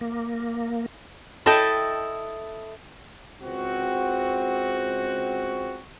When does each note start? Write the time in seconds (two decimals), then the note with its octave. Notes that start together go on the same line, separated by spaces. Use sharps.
0.01 A#3
1.46 E4 A4 D#5 E5 G5 A5
3.42 C#2 C4 F#4